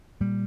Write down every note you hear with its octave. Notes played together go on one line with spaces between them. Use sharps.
A#2 G3